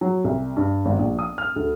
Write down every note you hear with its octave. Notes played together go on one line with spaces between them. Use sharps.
F#3
C2
G2
G#1
A#1
D#6
F6
D2